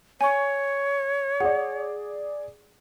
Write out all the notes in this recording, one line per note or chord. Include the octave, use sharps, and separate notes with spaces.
C#5 G#5 C#6
G#4 D5 F#5